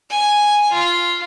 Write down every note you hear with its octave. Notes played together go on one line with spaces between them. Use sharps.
G#5
F4